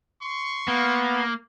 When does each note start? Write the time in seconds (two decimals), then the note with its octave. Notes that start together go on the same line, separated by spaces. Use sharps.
0.23 C6 C#6
0.68 A#3 B3